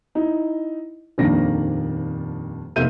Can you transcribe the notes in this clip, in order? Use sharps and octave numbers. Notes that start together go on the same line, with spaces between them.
D#4 E4
D#1 F2 D#3 A#3 D4 A#6
F1 A#3 D#4 E5 G6 D#7